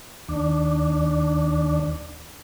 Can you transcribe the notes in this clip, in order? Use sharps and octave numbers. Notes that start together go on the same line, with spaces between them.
D#2 D4